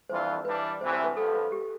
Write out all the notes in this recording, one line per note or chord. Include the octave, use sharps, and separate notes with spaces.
F2 E3 G3 D4 F4 C5
E3 G3 D4 B4
D2 C3 E3 C5
C5
B4
G2 F3 B3 A4
B4
G4